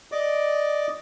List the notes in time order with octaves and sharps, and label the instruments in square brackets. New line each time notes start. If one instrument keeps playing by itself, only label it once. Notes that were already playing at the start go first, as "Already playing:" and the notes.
[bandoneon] D5 D#5 D6